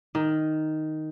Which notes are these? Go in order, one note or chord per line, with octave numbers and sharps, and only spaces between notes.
D#3